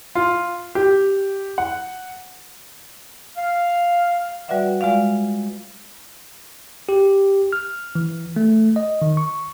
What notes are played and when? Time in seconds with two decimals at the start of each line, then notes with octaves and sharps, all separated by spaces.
0.15 F4
0.75 G4
1.58 F#5
3.36 F5
4.48 G3 F#4 B4 D5 E5 F#5
4.81 G#3 F4 D5 F5
6.89 G4
7.52 F6
7.95 E3
8.36 A3
8.76 D#5
9.02 D#3
9.17 C#6